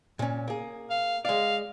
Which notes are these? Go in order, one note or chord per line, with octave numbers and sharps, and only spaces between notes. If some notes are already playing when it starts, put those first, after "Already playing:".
A#2 C#4
A#3 G#4
F5
G#3 D5 F5